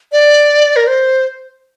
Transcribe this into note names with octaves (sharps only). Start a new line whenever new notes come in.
D5
A#4
C5